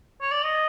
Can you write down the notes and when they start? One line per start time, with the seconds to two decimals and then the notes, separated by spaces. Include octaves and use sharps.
0.21 C#5
0.31 D5
0.43 D#5